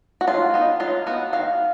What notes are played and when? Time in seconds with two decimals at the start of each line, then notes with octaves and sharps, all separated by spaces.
0.21 F#4
0.27 F#3 F4
0.54 B3 D#4
0.80 F#3 F4
1.07 B3 D#4 F#4
1.33 D#3 F5